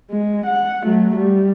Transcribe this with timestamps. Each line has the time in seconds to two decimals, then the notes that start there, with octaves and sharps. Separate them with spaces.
0.11 G#3
0.46 F#5
0.83 F#3 A3
1.16 G3